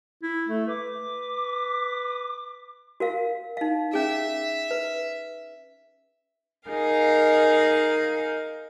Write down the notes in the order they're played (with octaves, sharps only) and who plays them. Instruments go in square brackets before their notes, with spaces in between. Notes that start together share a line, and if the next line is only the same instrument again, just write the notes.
[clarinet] E4
[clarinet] A3 [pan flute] A4
[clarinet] B4 [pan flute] D6
[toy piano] F#4 A#4 F5
D#4 F5
[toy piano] C#4 G#4 [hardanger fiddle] E5
[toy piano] B4
[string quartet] D#4 G#4 A#4 F5